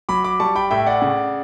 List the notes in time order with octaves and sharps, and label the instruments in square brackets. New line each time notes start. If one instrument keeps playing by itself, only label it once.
[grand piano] F#3 B5 D6
B5 D6
G3 A5 C#6
G5 B5
A2 E5 G5
D5 F#5
C#3